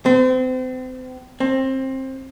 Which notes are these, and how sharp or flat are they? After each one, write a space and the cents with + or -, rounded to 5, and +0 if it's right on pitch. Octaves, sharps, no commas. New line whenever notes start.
C4 -35
C4 +20